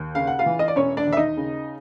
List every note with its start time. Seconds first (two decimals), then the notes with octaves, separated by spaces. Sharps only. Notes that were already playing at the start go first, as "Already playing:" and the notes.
Already playing: D#2
0.15 C#3 F5
0.27 F#5
0.39 F4 F5
0.46 E3
0.59 D#5
0.68 D5
0.76 E1 C#4 C#5
0.97 D4 D5
1.07 D#2
1.13 E5
1.17 D#4 D#5
1.37 C#3